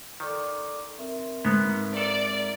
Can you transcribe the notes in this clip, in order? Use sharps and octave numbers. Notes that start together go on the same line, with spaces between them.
D#3 A4 D5 D6
C4 A#4 E5
G#2 G#3 B3
A4 D5